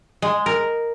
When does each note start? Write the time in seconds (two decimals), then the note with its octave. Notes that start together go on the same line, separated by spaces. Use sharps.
0.22 G#3
0.46 A#4